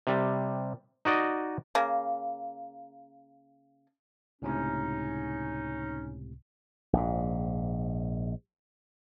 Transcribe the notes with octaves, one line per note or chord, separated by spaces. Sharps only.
C3 G3
D#4 F#4 D5 D#5
C#3 A#3
C#2 A2 C3 C#4 D#4
A#1 G#2